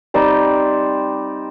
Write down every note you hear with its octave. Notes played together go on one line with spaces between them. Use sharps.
G3 C4 D#4 C5 D5